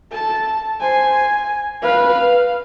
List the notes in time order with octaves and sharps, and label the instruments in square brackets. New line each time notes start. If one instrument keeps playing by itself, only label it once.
[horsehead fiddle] A4 [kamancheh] A5
[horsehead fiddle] C5 [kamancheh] G#5
[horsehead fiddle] B4 [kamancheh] F5